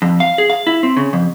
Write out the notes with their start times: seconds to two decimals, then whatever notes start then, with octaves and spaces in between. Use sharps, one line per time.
0.02 F2
0.20 F5
0.38 G#4
0.50 F5
0.67 E4
0.83 C4
0.97 C#3
1.13 F2